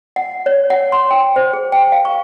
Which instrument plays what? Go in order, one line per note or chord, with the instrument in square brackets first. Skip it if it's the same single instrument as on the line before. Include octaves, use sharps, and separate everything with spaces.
[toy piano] F#5
C#5
F#5
C6
G5
C5
G#4
G5
F5
C#6